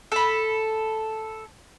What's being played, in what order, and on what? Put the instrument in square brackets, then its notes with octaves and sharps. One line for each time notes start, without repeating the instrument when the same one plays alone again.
[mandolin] A4 B5